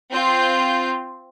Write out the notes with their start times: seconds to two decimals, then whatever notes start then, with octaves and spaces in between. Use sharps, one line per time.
0.11 C4 F4 G6